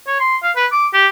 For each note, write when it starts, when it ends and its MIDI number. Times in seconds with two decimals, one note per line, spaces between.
0.07 0.17 73
0.20 0.36 84
0.43 0.51 77
0.56 0.67 71
0.72 0.87 86
0.94 1.08 67